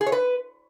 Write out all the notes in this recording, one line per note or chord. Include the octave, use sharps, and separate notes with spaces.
G#4
C#5
B4